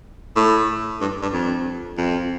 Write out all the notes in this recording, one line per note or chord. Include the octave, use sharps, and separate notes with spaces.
A2
G2
G2
F2
F2